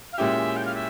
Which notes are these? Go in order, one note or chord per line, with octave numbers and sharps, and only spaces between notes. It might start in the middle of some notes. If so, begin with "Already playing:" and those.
F5
A#2 G#3 C#4 E4 G4 E5
G5
F5
E5